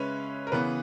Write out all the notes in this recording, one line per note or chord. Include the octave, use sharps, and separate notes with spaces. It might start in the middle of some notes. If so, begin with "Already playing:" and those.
Already playing: C#3 G#3 C#4 B4 C#5 E5
A#4
C#3 E3 B3 B4